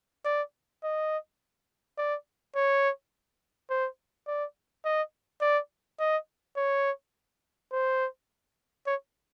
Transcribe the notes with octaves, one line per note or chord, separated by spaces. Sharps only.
D5
D#5
D5
C#5
C5
D5
D#5
D5
D#5
C#5
C5
C#5